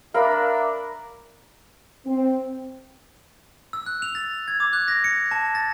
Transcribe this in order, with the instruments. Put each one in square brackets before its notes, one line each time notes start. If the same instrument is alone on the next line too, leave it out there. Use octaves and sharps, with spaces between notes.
[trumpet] D4 [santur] A#4 B5 [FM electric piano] E5 F5
[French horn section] C4
[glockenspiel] E6
F#6
F7
A6
G#6
D6
F#6
A#6
C#7
A5
A6